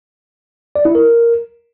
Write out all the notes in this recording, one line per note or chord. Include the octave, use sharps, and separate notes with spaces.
D5
E4
A#4